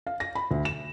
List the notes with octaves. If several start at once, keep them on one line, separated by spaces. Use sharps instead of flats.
F5
A#6
B5
D2
E7